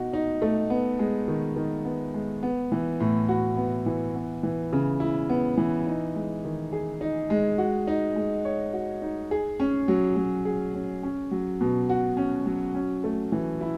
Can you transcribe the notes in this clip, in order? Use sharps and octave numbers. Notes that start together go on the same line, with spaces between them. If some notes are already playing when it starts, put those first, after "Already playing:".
Already playing: B2 D#4 F#4
D#4
A3
B3
G#3
D#3
D#3
B3
G#3
B3
E3
A2
F#4
B3
E3
B3
E3
C#3
E4
B3
E3
D#4
G#3
D#3
G#4
D#4
G#3
F#4
D#4
G#3
C#5
F#4
D#4
G#4
C#4
F#3
F#3
G#4
C#4
C#4
F#3
B2
F#4
C#4
F#3
C#4
A3
E3
E4